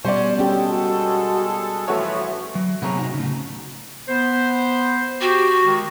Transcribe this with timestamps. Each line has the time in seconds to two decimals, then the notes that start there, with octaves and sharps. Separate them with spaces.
0.05 B2 G3 C#4 C5 D5
0.39 G#3 C#4 G4 A4 G5
0.70 F#4
1.88 E3 F3 A3 F#4 C#5 E5
2.55 F#3
2.82 C3 B3 G#4 B4 C#5 A#5
2.97 C3 D#4 F#4
3.14 A2 C#3
4.08 B3 C5
5.21 F#4 G4
5.64 D#3 G#3